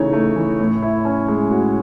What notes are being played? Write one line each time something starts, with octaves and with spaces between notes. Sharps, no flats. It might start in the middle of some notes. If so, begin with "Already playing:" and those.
Already playing: C#3 E3 A3 D#4 C#5
A3
E3
A2
E4
C#4
G#3
A2 F#4